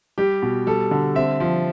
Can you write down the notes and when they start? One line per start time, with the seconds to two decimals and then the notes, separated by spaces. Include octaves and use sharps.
0.18 G3 G4
0.42 B2
0.67 G3 A4
0.91 D3
1.15 C4 E5
1.40 F3